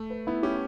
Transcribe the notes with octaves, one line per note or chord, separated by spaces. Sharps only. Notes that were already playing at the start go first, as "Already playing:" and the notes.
Already playing: A3
B4
B3 E4
C#4 G4